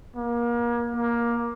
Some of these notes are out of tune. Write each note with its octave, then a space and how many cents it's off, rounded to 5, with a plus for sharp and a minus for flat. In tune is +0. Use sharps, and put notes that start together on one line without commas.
A#3 +30
A#3 +15